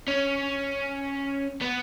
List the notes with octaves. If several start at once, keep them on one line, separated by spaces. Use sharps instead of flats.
C#4
B3